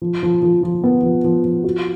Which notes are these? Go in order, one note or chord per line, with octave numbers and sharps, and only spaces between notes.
F3
F3
F3
F3
B3
F3
F3
F3
F#4